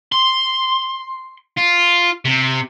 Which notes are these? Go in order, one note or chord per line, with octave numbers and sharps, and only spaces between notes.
C6
F4
C3